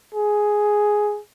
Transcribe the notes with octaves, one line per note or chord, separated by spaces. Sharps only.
G#4